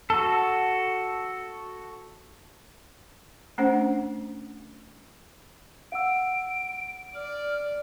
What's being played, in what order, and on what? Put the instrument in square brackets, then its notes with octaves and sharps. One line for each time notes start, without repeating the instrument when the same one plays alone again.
[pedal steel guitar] F#4 A4
[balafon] A3 C#4 D4 C5 F#5
[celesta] F5 F#5 E6 [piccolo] D7
[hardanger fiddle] D5 [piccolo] F6